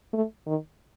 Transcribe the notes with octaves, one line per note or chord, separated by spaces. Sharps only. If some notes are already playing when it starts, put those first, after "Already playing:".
A3
D#3